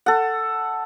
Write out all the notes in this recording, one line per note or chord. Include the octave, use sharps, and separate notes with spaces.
A4 F#5